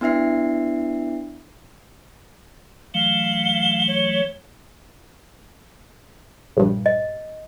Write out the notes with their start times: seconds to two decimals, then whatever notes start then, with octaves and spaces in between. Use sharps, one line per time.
0.01 B3 D4 E4 E5 C7
2.94 E3 F#3 A3 F5 G7
3.87 C#5
6.57 A#1 G2
6.86 D#5